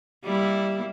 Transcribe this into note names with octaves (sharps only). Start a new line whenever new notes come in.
G3 A#3 E4